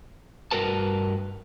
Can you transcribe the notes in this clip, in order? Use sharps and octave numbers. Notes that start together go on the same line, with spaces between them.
G2 F#4 A#4 B4 A5